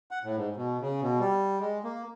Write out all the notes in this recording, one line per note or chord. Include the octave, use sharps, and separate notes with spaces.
F#5
A2
G#2
B2
C#3
B2
G3
G#3
A#3